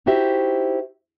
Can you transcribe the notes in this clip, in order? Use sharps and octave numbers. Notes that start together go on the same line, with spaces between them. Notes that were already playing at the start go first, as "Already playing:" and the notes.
D#4 E4 F#4 G4 C5 E5